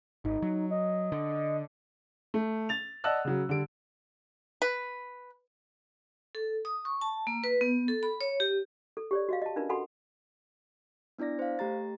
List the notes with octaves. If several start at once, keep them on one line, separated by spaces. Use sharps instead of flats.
G#1 D#4
F#3
D#5
D3
A3
A6 F7
D5 D#5 F#5 A5 E6 F#6
C#3 F#3
D3 G3 D7
B4
A4
D#6
C#6
A5
A#3
B4
B3
A4
B5
C#5
G4
A4
G4 C#5 D5
F#4 D#5 F5
D#5 A5
C#4 D4 F4 A#4 B4
F#4 A4 F#5 G#5 B5 C6
B3 D4 E4 D5 A#6
C5 F5
A3 G4 A#5 A6